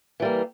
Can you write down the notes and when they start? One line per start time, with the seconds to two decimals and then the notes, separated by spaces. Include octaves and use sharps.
0.20 E3
0.22 G3
0.25 A#3